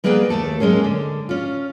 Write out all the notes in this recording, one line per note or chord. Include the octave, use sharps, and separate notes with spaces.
G3 A#3 B3 G#4 B4 G5
D#2 G#2 A3 A4
F#3 G#3 A#3 C#4 G#4
D3
C#4 F4